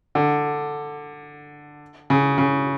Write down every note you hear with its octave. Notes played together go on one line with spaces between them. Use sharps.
D3
C#3
C#3